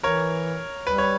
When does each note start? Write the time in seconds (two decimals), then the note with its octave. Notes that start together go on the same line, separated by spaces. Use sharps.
0.03 E3 A#4 C#5
0.85 G3 B4
0.98 C#5